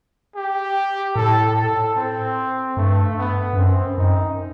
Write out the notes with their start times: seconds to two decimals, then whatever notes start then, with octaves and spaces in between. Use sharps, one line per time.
0.35 G4
1.16 A2 A4
1.56 A4
1.96 C4
2.77 G2 A3
3.18 B3
3.53 G2
3.57 F#2 C4
3.98 F#2 D#4